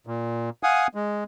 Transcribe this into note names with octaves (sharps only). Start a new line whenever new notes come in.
A#2
F5 F#5 G#5 D#6
G#3